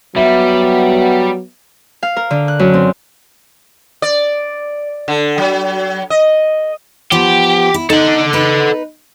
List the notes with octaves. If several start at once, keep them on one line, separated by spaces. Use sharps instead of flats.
F#3 G3 B3 E5
F5
A#4
D3
F#6
F#2
C4
D5
D3
F#3
D#5
F3 B3 G4
E4
D#4 A4 F#5
D#4 B4